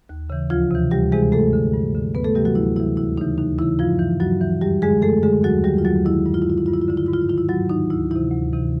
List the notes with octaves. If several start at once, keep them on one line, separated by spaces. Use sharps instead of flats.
D#2
C#3 E3
D2 F3 F4
C3 E3
D2 G3 G4
C3 E3 G#3 G#4
G2 A3 A4
D3
G2
D3
D2 B3 B4
A3 A4
C3 E3 G3 G4
F#3 F#4
D2 E4
C3 E3 E4
D#2 E4
C#3 E3 D#4
D#2 D#4
C#3 E3 E4
G2 F3 F4
E3
G2 F#3 F#4
E3
F#2 G3 G4
D3 G#3 G#4
F#2 A3 A4
D3 G#3 G#4
D#2 F#3 F#4
D#3 G3 G4
F4
D#2 F#3 F#4
D#3 E4
G2 E4
F4
E4
D3 F4
E4
G2 F4
E4
F4
D3 E4
F4
G#2 E4
F4
E4
D#3 F4
E4
G#2 F#3 F#4
D#3 D#4
D2 E4
C3 E3 E4
D2
C3 E3